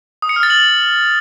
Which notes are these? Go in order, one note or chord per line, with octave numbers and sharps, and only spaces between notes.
D#6
C#7
F6
A6
F#7